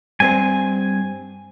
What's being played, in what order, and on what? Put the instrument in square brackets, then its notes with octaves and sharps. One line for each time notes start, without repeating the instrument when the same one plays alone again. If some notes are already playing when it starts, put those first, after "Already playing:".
[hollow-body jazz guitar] G2 C4 C5 [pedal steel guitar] G#5